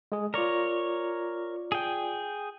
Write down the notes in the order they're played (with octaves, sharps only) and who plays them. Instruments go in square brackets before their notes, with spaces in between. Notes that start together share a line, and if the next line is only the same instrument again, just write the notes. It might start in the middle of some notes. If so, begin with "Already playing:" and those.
[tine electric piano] G#3 G#4
[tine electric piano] F4 D5 [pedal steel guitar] A#4 C#5
[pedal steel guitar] G#4 G5